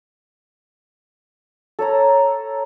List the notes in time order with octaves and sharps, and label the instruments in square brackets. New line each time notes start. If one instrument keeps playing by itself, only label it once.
[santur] A4 C#5 A#5